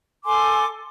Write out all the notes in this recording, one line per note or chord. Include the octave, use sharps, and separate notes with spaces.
A4 G#5 C6 D6